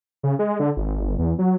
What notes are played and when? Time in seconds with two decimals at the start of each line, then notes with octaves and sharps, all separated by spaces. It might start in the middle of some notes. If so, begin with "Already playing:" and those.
0.23 C#3
0.39 G#3
0.60 D3
0.77 G#1
1.01 G1
1.18 E2
1.39 F#3